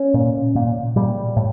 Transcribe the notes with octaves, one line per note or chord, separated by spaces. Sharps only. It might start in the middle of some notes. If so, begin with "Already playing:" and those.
Already playing: C#4
A#2
A#2
A#2 G3
A2